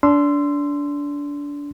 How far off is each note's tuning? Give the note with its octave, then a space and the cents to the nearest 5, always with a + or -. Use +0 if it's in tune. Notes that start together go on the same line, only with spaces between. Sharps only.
D4 -25 C6 -10 E6 +25